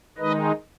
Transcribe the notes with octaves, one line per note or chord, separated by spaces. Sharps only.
D#3 G#3 D#4 B4 D#5